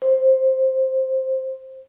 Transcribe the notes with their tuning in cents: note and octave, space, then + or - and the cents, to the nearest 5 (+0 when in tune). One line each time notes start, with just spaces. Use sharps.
C5 +5